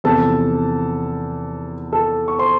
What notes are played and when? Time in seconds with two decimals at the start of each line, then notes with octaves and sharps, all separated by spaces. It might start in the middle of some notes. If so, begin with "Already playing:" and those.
0.04 E2 C3 F3 A4 A5
1.92 A4 A5
2.28 C#6
2.38 C5 C6